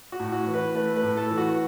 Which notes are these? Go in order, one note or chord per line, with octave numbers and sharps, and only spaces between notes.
F#4
A2
F#4
E3
B4
A3 B4
B4
A2
A4
E3
F#4